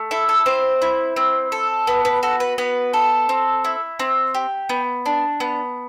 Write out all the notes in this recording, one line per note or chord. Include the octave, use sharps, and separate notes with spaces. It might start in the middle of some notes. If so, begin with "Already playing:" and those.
Already playing: A3
E4 A4
A4
C4 C5
E4
C4
A4
B3 B4
B4
F#4 A4
B4
B3 B4
A4
C4
E4
C4
G4
B3
D4
B3